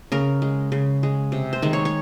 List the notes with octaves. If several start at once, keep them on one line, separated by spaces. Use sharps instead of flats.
C#3 A#4
G#3
C#3
G#3
C3
C5
D#3 G#3
C#5
C#5